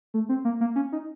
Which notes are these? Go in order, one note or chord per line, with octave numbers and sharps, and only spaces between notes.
A3
C4
A#3
A#3
C#4
D#4